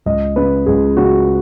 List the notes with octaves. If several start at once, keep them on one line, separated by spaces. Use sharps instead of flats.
C#2 D#5
C#3 B4
C#2 G#4
C#3 F#4